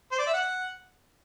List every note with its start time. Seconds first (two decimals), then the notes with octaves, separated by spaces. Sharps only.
0.12 C5
0.18 D5
0.27 E5
0.34 F#5